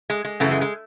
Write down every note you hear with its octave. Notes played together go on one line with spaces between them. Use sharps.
G#3
G#3
F#2 C#3 E3 A3
G#3
G#3